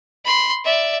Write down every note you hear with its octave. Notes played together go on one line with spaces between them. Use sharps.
B5 C6
D5 E5